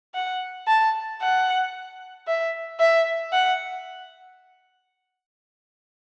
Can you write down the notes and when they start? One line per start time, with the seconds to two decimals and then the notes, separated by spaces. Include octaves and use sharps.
0.15 F#5
0.67 A5
1.21 F#5
2.27 E5
2.80 E5
3.33 F#5